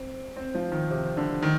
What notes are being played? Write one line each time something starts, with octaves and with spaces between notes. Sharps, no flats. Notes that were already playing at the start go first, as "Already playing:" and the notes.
Already playing: C4
C4
F3
D#3
C3
D3
D#3